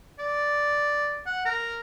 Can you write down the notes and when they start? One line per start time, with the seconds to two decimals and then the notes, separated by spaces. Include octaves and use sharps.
0.19 D5
1.26 F#5
1.46 A#4